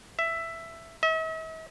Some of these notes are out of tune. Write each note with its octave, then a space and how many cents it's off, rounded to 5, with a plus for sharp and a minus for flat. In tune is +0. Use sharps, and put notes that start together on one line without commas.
E5 +10
E5 -45